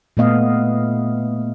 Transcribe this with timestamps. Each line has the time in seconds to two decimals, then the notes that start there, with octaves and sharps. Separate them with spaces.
0.17 A#2 A3 B3 D#5 F5